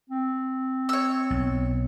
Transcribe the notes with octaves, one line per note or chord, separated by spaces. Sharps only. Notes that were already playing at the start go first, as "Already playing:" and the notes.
C4
C#5 E6
B1